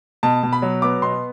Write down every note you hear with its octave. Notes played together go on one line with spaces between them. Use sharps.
B2 A5
B2
B5
F#3
B3 D6
B2 C6